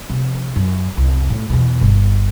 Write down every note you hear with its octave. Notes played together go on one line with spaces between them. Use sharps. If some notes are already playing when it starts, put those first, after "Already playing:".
C3 F3
F#2
C2 F2
A2
E2 B2
G1